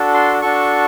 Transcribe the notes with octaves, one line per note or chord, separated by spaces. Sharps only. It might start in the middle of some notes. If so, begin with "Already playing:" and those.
Already playing: D4 F#4 A4
C6
D4 F#4 A4 C#6